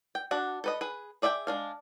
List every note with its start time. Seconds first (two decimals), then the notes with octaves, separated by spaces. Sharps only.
0.15 G5
0.31 D4 F#4 F#5
0.64 A4 B4 D#5
0.81 G#4 B4
1.22 G#4 D5 E5 F5 G5
1.47 G#3 D4 F5